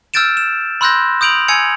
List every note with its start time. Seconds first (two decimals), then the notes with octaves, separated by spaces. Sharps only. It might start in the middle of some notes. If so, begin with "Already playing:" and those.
0.14 E6 F6 G6 A6 D7 E7
0.37 E7
0.81 B5 C6 E6 F#6 G6 A#6
1.21 D#6 G6 D7 F7 F#7
1.48 G#5 E6 G#6 C#7 F7